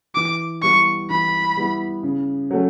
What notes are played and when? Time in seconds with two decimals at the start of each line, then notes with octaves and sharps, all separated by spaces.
0.15 E3 D6
0.62 G3 B3 E4 C#6
1.10 E3 B5
1.57 G3 B3 E4
2.03 C#3
2.51 F#3 A3 C#4